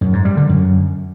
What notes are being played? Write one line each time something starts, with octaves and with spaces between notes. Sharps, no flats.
F#2
G#2
G3
D3
F#2